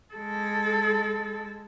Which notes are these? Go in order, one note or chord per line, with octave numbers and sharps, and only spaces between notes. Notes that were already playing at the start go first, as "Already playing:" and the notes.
G#3 A4